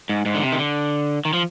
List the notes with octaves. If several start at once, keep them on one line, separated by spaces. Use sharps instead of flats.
G#2
G#2
D3
C3
D#3
D3
D#3
F3